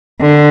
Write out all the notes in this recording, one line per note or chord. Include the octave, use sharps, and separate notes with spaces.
D3